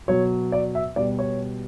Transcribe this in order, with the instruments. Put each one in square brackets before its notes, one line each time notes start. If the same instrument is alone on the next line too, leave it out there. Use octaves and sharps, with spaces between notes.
[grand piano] B2 F#3 C#5
D5
E5
B2 G3 D5
C#5